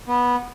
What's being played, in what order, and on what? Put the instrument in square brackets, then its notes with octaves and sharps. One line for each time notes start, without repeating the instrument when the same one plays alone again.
[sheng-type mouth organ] B3